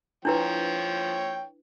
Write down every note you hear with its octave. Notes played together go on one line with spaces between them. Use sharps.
F3 D4 E4 B4 C#5 G5